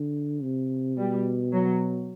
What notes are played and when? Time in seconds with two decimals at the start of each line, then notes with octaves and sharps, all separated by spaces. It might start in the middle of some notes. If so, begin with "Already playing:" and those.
Already playing: D3
0.42 C3
0.97 B2 G3
1.53 F#3